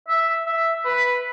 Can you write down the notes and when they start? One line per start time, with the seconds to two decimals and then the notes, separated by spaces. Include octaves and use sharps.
0.08 E5
0.47 E5
0.85 B4